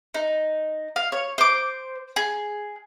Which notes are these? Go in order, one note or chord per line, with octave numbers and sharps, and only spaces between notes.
D#4
F5
C#5
C5 D6
G#4